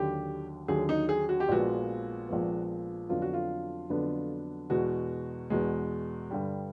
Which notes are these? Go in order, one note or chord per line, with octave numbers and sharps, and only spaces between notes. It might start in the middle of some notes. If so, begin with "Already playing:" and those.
Already playing: D#2 D3 F#3 G4
D#2 D3 F#3 G#4
D#4
G#4
F#4
G4
A#1 A#2 F3 G#3 B3 F#4
A#1 A#2 F3 G#3 B3
F2 D3 F#3 B3 D4 F4
F#4
F4
F2 D3 F#3 B3 D4
E2 B2 G#3 F#4
E2 B2 G#3
G2 D3 G3